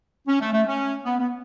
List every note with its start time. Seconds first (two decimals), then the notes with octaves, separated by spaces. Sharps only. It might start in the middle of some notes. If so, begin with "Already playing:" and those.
0.28 C#4
0.40 A3
0.53 A3
0.66 C#4
1.05 B3
1.18 B3